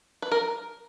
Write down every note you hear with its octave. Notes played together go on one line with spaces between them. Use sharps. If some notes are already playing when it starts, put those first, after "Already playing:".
B4
A#4